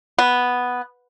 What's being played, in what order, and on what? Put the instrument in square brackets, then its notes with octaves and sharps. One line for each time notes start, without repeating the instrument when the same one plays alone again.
[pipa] B3